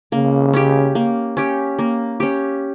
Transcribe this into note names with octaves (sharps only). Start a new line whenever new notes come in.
C#3 A#3
C#4 G4
A#3
C#4 G4
A#3
C#4 G4